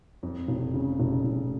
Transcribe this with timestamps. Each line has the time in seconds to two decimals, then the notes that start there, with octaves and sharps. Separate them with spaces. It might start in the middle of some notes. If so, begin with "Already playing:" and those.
0.23 F2
0.48 F1
0.74 C#3
1.00 F1
1.24 F1